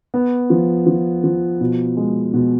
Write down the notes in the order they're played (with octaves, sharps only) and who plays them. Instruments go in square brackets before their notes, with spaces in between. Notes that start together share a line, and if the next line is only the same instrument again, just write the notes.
[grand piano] B3
F3
F3
F3
B2
G#3
B2